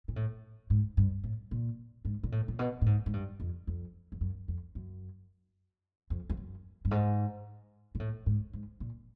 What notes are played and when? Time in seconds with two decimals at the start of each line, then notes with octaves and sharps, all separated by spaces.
0.08 A#2
0.16 A2
0.70 G#2
0.97 G2
1.24 A2
1.51 A#2
2.05 G#2
2.23 A#2
2.32 A2
2.48 A#2
2.59 B2
2.82 A2
2.86 G#2
3.06 G#2
3.13 G2
3.40 F2
3.67 F2
4.12 F2
4.21 F#2
4.48 F2
4.75 F#2
6.10 F2
6.30 F2
6.37 F#2
6.85 G2
6.91 G#2
7.95 A#2
8.00 A2
8.26 G#2
8.53 G#2
8.80 A#2